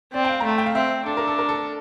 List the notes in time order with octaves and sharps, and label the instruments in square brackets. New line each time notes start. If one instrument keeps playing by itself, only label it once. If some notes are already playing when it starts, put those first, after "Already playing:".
[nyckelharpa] C4 [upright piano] D5
[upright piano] G5
F5
A#5
[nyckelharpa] A3 [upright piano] A5
[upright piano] G5
F5
[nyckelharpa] C4 [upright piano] E5
[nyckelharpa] D4 [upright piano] A4
[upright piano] A#4
A4
A#4
A4